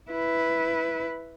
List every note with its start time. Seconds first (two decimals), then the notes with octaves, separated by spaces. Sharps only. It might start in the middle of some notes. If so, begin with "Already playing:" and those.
0.11 E4 B4